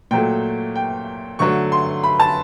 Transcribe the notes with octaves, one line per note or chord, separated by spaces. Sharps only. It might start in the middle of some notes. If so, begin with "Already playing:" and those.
A#2 F#3 A3 G5
G5
D3 F#3 A3 C#6
C6
B5
A5